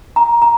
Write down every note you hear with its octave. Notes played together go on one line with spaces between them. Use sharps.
A#5
A#5